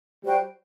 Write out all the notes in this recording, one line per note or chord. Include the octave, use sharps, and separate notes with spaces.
G3 F#4 C5 G5